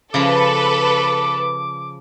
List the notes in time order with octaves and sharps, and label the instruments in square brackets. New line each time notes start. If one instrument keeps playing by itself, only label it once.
[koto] C#3 F3 [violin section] A4 B4 [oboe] D6